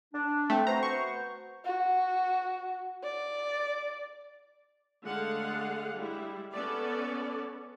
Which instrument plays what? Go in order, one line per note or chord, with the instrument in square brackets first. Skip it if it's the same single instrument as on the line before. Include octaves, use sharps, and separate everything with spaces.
[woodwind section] D4
[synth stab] A3 [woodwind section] C4
[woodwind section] B3 F#4 C5 [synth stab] A#5
[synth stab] C#6
[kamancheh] F#4
D5
[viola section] D3 G#3 A3 F5 F#5
G3 G#3 E4
B3 C#4 A4 D5